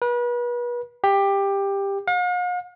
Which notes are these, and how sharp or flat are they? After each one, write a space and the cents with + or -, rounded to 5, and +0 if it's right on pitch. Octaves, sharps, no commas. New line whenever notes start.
B4 -35
G4 +15
F5 +45